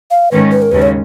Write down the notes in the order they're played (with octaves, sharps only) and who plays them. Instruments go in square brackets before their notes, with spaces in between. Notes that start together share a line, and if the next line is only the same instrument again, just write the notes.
[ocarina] F5
[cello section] G#2 D#3 G#3 C#4 [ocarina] B4
[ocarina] B4
A#4
[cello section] D#2 C#3 G#3 C#4 [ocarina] B4
[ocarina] C#5